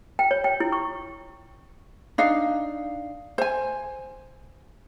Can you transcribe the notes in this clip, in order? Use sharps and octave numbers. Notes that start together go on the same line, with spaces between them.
G5
C#5
G5
E4
C#6
D4 D#4 F5
C5 G#5